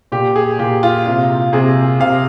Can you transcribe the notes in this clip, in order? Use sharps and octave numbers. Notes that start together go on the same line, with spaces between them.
A#2 G4
G#4
A#2 G4
F4
C3 F4
C3 G#4
C3 F5